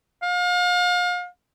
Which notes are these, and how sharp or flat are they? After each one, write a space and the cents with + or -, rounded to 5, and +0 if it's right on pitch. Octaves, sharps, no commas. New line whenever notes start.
F5 +35